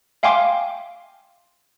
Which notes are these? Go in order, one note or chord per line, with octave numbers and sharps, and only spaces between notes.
E5 F5 G5 G#5 C6 D6